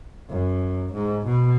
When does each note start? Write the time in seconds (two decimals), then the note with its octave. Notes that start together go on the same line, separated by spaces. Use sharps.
0.29 F#2
0.92 G#2
1.25 B2